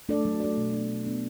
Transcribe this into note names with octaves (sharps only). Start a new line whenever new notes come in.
A3 D4 A4 D5
F#3
A3 D4 A4 D5
B2
B3 D4 A4
B2
B3 D4 A4